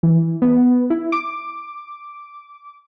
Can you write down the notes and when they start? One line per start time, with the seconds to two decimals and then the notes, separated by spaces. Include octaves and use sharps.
0.03 E3
0.42 B3
0.90 E4
1.12 D6